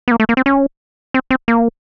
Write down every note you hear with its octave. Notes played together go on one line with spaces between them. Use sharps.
B3
A#3
A3
A#3
C4
C#4
C4
C4
A#3